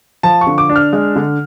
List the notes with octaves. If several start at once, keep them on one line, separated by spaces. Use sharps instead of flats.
F3 A5
C#6
D3
D6
D4
F6
G#3
D3